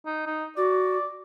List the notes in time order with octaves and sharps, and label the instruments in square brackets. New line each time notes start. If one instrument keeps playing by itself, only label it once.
[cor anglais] D#4
D#4
[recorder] F#4 [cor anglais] D5